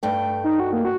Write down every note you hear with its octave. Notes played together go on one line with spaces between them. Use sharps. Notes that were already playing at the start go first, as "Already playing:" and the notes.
G2 A3 G5
D#4
F#4
A#3
F#4